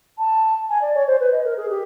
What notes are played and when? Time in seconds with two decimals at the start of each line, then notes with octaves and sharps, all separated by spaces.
0.18 A5
0.70 G#5
0.82 D5
0.95 C#5
1.07 C5
1.20 B4
1.32 D#5
1.44 A#4
1.57 G#4
1.70 G4